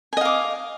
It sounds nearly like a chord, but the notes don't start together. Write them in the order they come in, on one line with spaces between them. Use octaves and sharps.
G#5 D#5 F5 D6